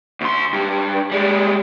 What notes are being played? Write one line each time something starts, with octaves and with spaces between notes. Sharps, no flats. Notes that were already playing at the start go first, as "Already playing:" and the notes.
D2 C6
G2
G3 G#3